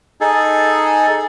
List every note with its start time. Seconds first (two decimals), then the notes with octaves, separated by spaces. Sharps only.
0.21 D#4 G#4 A4